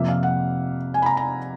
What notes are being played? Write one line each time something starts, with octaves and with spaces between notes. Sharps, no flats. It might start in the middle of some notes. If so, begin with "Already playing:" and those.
Already playing: F2 C3 F3 A#3 E5
F5
F#5
G#5
B5
A#5
A#5